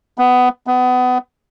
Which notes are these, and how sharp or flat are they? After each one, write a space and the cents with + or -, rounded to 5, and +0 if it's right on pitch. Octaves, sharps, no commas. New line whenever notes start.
B3 +15
B3 +25